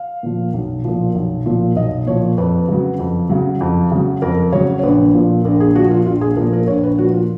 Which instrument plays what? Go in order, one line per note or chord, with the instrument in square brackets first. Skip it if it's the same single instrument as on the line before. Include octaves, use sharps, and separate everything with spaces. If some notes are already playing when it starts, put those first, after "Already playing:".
Already playing: [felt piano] F5
A#2 F3
B1
A#2 F3
B1
A#2 F3
B1 D#5
A#2 F3 C#5
F2 B4
C#3 F#3
F2
C#3 F#3
F2
C#3 F#3
F2 A#4
C#3 F#3 C#5
C#5
A#1 B4
A#2 F3
A#1 A#4
G#4
A#2 F3 F#4
F4
A#1 F4
G#4
A#2 F3 A#4
A#4
A#1 C#5
B4
A#2 F3 F#4
F4